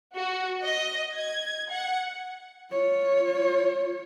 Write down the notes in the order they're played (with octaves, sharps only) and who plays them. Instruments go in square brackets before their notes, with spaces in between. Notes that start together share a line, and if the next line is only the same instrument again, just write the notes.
[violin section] F#4
D#5
G#6
F#5
[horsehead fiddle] F4 C#5